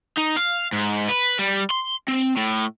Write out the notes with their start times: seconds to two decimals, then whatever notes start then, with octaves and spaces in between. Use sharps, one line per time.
0.18 D#4
0.37 F5
0.73 G#2
1.08 B4
1.39 G3
1.70 C6
2.08 C4
2.37 A2